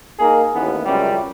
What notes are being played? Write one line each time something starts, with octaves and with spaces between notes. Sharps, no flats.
A#3 D#4 G#4
A1 D#2 A2 B3
C#2 F#2 C3 G3